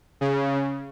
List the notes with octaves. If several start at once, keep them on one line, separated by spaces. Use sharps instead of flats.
C#3